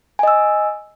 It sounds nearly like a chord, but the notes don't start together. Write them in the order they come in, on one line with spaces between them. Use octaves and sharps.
G#5 D#5 E6